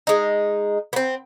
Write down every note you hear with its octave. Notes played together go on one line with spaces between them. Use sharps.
G#3 D#4
B3 C4